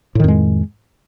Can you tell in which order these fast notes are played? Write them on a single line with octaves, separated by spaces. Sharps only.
A2 D#3 F2 G#3